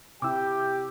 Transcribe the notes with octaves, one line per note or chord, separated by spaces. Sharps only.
C3 E4 G4 G5 D6 E6